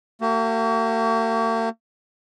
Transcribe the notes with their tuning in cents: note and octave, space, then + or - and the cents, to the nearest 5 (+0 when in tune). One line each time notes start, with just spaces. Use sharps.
A#3 -45 F#4 +40